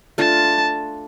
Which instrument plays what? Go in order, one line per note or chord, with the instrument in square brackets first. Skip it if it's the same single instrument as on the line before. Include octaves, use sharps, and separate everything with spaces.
[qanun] A3 D4 F4 [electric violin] A5